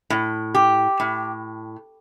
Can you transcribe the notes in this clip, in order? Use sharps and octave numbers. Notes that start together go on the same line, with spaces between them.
A2
G4
A2